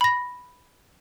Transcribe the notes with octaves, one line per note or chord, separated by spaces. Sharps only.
B5 A#6